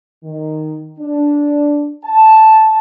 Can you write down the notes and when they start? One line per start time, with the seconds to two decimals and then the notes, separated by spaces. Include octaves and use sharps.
0.24 D#3
0.99 D4
2.04 A5